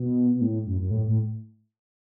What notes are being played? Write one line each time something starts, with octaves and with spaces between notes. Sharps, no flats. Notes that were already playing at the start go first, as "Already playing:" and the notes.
Already playing: B2
B2
A2
F#2
F#2
A2
A2